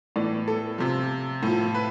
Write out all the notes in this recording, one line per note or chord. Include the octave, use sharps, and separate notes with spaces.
A2 E3 D5
A4
C3 F3
A2 F3
B4